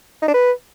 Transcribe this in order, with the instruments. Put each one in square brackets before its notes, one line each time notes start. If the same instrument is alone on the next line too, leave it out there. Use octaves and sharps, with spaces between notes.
[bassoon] D#4
D4
B4